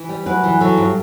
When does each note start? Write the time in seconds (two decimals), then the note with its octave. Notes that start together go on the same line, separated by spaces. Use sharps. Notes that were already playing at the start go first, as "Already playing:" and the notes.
Already playing: E3
0.09 G3
0.26 F#2 B4
0.43 E3
0.60 F#3 A4
0.77 G2